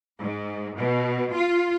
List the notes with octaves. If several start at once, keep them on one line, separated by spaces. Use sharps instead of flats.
G#2
B2
F4